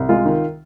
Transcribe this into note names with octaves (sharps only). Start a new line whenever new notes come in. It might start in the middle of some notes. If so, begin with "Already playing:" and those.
Already playing: C2
G#3 F4
D#3